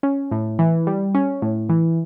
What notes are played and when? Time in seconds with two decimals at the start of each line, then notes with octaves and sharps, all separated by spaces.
0.03 C#4
0.31 A2
0.59 E3
0.87 G3
1.15 C#4
1.42 A2
1.69 E3